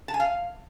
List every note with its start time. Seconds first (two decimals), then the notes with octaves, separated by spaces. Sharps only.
0.08 A5
0.14 G#5
0.20 F5